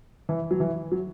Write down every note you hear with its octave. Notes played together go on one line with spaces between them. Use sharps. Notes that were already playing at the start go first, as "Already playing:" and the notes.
E3
F#3
E3
F#3